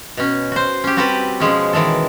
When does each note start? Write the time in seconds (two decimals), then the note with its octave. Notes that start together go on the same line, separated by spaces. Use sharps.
0.17 B2 C#4
0.52 F#4 C5
0.84 C#4 G4
0.97 G3 C4 F#4 G4 A4 B4
1.40 B2 F3 G#3 C#4
1.73 D#3 E3 G#3 A4